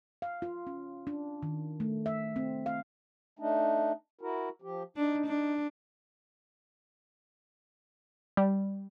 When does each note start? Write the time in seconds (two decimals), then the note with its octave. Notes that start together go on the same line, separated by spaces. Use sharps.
0.22 F5
0.42 F4
0.67 C#4
1.07 D4
1.42 D#3
1.80 A3
2.06 E5
2.36 C4
2.66 F5
3.39 A3 D4 D#4
4.21 E4 F#4 A#4
4.62 F3 G4
4.97 D4 D#4
5.27 D4
8.37 G3